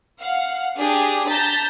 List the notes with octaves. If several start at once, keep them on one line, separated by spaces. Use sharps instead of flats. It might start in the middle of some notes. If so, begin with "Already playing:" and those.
F5 F#5
D4 G4 G#4
A5 A#5 G6 A6 B6